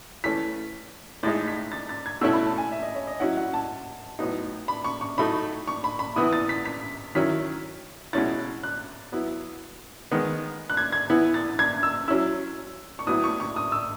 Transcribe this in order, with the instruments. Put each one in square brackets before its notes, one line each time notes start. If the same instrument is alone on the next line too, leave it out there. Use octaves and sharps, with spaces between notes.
[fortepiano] E3 A3 C#4 [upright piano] B6
[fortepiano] A2 G#3 D#4 [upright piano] A6
[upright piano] B6
A6
A6
G#6
[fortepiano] B2 A3 C#4 E4 [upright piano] E6
[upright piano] B5
A5
G#5
E5
D#5
C#5
D#5
[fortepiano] F#3 C#4 E4 [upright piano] F#5
[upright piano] F#5
A5
[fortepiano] A2 F#3 B3 D#4
[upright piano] B5
C#6
C#6
[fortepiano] A2 F#3 A3 D#4 [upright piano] B5
[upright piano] C#6
B5
B5
[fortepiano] E3 B3 E4 [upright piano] D#6
[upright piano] A6
B6
B6
[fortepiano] D#3 F#3 C#4 E4 [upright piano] B6
[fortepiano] B2 G#3 C#4 E4 [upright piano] A6
[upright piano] F#6
[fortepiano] F#3 B3 E4
D#3 G#3 B3
[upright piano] F#6
G#6
G#6
[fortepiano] E3 B3 E4
[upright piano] A6
G#6
E6
[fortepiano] F#3 C#4 E4 [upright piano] E6
[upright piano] C#6
[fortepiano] A2 F#3 B3 E4 [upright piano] D#6
[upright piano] C#6
C#6
D#6
E6